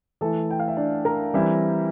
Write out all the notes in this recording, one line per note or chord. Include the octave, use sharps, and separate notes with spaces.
E3 A3 E4 A4
G5
F5
E5
D4 D5
A#4 A#5
E3 G3 C4 E4